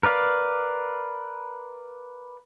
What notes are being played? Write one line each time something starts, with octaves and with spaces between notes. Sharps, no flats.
A#4 B4 D5 F5